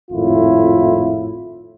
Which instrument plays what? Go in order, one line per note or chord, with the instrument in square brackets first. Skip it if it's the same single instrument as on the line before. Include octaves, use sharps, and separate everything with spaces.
[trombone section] G#1 F2 A2 E4 F4